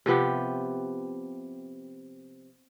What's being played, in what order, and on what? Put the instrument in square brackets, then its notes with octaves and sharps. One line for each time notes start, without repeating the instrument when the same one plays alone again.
[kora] C3 F3 B3 G4